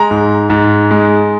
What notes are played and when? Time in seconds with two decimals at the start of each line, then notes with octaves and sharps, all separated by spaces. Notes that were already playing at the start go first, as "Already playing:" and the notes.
Already playing: G#3 A#5
0.11 G#2
0.50 G#2
0.91 G#3